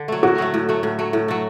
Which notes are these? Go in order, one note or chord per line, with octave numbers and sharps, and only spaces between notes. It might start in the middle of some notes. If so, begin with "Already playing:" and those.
Already playing: D3
F#3 A3
A2 F#4
F#3 A3
A2
F#3 A3
A2
F#3 A3
A2
F#3 A3